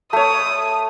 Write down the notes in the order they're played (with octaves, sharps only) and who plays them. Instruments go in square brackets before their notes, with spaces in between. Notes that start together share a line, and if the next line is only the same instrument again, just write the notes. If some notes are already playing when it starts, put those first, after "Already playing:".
[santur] A3 C#5 [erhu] D#6